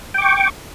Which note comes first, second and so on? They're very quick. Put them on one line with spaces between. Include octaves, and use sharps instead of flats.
G5 D6 C#6